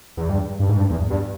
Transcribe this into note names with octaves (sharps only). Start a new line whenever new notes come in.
E2
G2
G2
G#2
G2
E2
G2